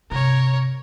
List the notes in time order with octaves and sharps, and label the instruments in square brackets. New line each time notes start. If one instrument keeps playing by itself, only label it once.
[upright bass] G2 C3 [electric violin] A#4 C#5